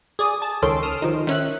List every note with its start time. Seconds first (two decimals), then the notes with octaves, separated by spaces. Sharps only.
0.19 G#4 D5 D#6
0.42 A5
0.62 C#2 D#3 C#4 A4 C6 D7
0.83 D#6 F6 C7 E7
1.02 D#3 F3 D#4
1.27 D#3 C#4 E5 F#6